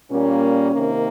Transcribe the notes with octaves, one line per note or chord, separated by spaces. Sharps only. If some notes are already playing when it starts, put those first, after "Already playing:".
A#2 G3 A#3 C#4
C3 D#3 A#3